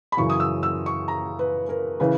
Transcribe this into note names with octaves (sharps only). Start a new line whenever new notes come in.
B5
F#2 C#3 E3 C#6
D#6
E6
E6
C#6
A#5
B4
A#4
C#3 E3 B4